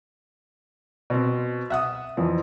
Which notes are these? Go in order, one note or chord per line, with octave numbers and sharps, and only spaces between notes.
B2 C4
E5 F#5 D#6
F2 E3 F3